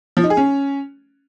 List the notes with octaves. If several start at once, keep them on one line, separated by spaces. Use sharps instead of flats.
F3
D#4
G#4
C#4